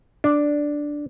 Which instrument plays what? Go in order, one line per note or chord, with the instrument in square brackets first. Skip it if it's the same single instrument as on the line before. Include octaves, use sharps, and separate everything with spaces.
[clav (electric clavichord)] D4